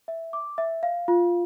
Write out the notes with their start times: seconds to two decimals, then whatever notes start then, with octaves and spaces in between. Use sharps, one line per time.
0.08 E5
0.33 D6
0.58 E5
0.83 F5
1.08 F4